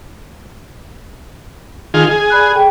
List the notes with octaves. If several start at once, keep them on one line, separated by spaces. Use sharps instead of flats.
D#3 F4 G#4
G#4
D5 B5 F#6
G#4 A4 G5